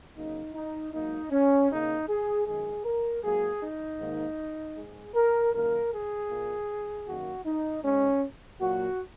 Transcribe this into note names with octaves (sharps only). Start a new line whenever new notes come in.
C#3 F#3 A#3 D#4
D#4
G#2 F#3 A#3 D#4
C#4
C#3 A#3 D#4
G#4
F#2 D#3 G#3 G#4
A#4
G#2 F#3 A#3 G#4
D#4
G#2 D#3 A#3
G#2 G#3 G#4
A#4
F#2 D#3 A#3 A#4
G#4
A#2 A#3
F#2 D#3 A#3 F#4
D#4
G#2 G#3 C#4
A#2 F#3 A#3 F#4